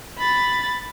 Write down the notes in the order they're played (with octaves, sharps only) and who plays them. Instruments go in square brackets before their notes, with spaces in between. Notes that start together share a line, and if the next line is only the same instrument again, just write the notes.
[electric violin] B5 A6